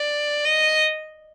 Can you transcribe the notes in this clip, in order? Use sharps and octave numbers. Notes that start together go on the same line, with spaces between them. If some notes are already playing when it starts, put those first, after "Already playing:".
Already playing: D5
D#5